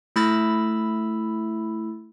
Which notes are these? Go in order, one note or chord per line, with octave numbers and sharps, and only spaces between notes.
A3 E4 B5 E6 A6